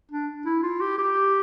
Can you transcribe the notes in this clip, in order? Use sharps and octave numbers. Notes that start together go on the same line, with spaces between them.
D4
E4
F4
G4
G4